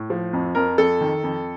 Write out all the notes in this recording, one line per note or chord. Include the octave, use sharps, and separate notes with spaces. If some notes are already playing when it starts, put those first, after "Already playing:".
Already playing: A2
F3
F2
F2 A#4
F2 A4
D#3
F2